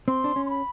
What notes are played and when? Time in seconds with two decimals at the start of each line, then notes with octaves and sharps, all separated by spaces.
0.08 C4 C6
0.24 D4
0.36 C#4
0.46 C6
0.50 B5